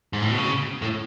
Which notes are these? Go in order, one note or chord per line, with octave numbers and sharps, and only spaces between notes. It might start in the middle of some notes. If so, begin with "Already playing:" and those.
G#2
A2
B2
C#3
A2